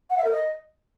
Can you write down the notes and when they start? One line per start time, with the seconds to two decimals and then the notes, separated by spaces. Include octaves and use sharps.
0.10 F#5
0.17 E5
0.24 A#4
0.31 D#5